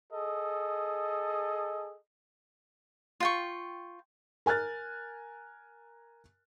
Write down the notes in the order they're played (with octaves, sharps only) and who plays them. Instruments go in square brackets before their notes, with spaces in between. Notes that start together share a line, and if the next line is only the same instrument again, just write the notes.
[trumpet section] G#4 A4 D#5
[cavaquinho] F4 G5 C#6
[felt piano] A#4 G#5 F6 F#6 A6